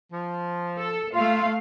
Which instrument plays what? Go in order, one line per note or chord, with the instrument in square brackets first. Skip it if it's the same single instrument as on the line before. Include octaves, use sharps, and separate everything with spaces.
[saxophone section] F3
[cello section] A4
[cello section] A3 F5 [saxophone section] F4